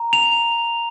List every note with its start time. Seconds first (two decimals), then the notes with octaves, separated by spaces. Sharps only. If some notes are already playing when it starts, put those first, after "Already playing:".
Already playing: A#5
0.13 F7